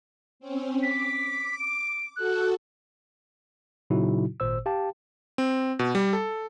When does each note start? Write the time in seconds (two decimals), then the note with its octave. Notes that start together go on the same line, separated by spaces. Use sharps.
0.40 C4 C#4
0.83 D6 B6
1.59 D7
2.16 F#4 A4 F#6
3.90 A#2 C#3 F#3 D#4 E4 F#4
4.40 G#1 A#2 C5 E6
4.66 G4 F5 G5 A5
5.38 C4
5.79 B2
5.95 G3
6.13 A4